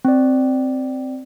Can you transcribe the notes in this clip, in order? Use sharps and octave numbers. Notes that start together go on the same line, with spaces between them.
C4 D5